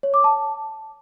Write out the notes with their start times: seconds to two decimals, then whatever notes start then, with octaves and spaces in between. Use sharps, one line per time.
0.03 C#5
0.14 D6
0.24 A5